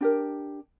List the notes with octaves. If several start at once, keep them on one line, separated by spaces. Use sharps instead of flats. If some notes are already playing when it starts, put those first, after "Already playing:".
D4 G4 A#4